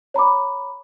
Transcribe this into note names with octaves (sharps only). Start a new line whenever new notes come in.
C#5 A#5 B5 D6